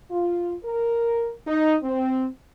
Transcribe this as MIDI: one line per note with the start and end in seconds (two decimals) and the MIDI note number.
0.10 0.55 65
0.64 1.32 70
1.46 1.75 63
1.83 2.26 60